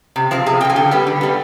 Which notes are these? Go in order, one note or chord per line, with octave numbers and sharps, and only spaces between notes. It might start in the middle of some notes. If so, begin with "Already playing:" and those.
C3
F3 C4 C5
C3 G#4
C4 G5
F3 G#5
D3 G5
G3 B3
D3
G3 B3